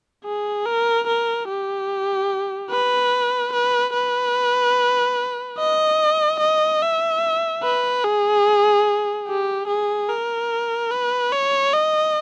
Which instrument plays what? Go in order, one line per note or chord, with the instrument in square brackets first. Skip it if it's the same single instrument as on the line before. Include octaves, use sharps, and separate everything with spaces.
[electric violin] G#4
A#4
A#4
G4
B4
B4
B4
D#5
D#5
E5
B4
G#4
G4
G#4
A#4
B4
C#5
D#5